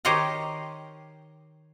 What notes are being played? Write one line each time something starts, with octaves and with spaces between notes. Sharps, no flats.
D#3 G4 C5 C#5 D#5 A#5